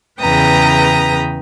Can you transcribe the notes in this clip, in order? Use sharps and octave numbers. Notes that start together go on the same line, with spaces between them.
E2 C#3 B4 G5 A#5 D#6